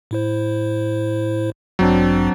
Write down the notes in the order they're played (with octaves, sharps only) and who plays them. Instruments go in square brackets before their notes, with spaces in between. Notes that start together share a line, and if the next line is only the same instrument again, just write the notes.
[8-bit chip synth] A2 E4 C5
[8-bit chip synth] A1 G2 [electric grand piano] F#3 C4 D4